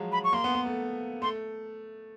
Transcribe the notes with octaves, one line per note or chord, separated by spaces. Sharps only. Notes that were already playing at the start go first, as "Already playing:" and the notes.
Already playing: F3 F#3 G#3
B5
C#6
A#3 C6
B3
B3
A3
A3 C6